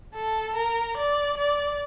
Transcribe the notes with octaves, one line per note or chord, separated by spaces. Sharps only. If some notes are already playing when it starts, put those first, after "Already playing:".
A4
A#4
D5
D5